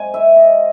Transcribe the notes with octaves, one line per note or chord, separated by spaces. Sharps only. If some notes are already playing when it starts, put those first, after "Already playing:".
Already playing: G#2 F#3 C4 D#4 G#5
E5
D#5